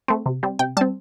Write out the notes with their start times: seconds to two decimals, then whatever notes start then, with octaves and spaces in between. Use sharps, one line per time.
0.08 A3 C4
0.26 C3
0.43 G3 C4
0.59 C3 G5
0.77 G3 A5
0.81 C4